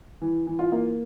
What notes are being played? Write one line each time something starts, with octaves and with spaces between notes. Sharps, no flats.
E3
E3
F4
A#3